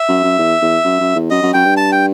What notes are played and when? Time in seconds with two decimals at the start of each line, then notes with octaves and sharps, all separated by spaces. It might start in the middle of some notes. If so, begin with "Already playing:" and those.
Already playing: E5
0.08 F#2
0.24 F#2
0.39 E2
0.62 E2
0.85 F#2
1.00 F#2
1.16 E2
1.31 F#2 D#5
1.42 F#2
1.54 F#2 G5
1.65 G2
1.77 A5
1.92 G5